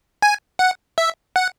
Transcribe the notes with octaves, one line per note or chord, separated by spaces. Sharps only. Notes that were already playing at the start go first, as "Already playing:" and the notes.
G#5
F#5
E5
F#5